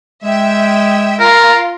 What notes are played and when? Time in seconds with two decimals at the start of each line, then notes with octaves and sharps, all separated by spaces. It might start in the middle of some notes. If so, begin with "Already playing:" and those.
0.24 G#3 E5 G5
1.20 F4 A#4